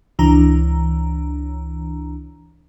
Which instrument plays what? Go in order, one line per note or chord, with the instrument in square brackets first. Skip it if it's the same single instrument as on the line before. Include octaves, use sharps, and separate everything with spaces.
[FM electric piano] C#2 E3 D4 A#5